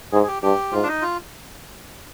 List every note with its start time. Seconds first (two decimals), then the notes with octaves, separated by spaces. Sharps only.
0.12 G#2 G#4
0.23 G#4
0.28 G4
0.43 G2 G4
0.72 G#2 F4
0.83 D4
0.88 D#4
1.02 F4